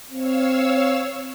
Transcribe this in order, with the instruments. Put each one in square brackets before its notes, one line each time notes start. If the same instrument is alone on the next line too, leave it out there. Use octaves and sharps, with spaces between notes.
[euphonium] C4 [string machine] C#5 F5 E6